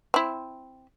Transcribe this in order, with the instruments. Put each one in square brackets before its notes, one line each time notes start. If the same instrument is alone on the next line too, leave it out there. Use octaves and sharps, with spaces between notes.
[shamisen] C4 E4